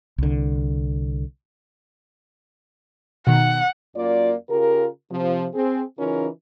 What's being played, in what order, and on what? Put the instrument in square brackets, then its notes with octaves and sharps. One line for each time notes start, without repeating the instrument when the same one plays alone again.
[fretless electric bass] C2 D3
[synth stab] B2 D#3 [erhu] F#5
[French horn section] F#2 A#3 F4 D5
C#3 F4 G4 A#4
C3 F3
C4 G#4
C#3 E3 C#4 D#4 F4 A#4